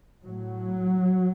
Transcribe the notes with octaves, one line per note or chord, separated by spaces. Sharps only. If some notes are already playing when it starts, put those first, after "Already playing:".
A2 F#3